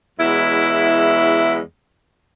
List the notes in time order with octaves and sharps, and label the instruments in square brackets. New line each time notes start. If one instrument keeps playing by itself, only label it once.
[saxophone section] E2 F#3 G#3 E4